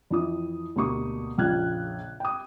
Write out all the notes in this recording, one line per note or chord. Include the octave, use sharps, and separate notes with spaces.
F2 E3 D#6
D2 B2 A#3 G4 C#6 D#6
A#1 F2 C#3 F6 F#6 G#6
G5 D#6